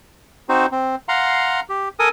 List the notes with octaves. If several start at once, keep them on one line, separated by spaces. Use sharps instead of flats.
C4 D#4 F#4 C5
C4
F5 F#5 A#5 C6
G4
A4 A#4 G#5 D#6